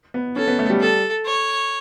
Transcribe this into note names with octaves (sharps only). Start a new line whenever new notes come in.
B3
C#4 A4
B3
A3
G3
A4
C#5